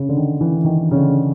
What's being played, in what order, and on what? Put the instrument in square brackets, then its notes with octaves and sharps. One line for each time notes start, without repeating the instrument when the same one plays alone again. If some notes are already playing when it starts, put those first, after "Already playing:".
Already playing: [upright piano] C#3
D3
D#3
E3
D#3
C#3
D3